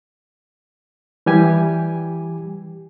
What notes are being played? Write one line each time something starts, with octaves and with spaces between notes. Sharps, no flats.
E3 G3 G4 G#5